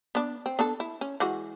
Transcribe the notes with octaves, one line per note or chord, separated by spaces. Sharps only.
B3 D4
C4
B3 D4 A4
E4
C#4
E3 G#3 F#4